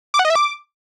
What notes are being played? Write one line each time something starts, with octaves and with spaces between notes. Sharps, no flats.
D6
F#5
D#5
E5
D6